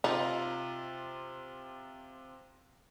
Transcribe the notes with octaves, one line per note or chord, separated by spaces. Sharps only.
C3 D#4 F4